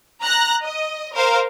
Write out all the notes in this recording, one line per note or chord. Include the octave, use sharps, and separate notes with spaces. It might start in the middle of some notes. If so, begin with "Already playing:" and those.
A#5 F#6 A#6
D#5
A#4 C5 F5